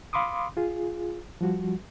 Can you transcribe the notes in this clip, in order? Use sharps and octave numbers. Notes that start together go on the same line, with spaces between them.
F5 B5 C6 D6 D#6
F4 G#4
F3 G3 F#4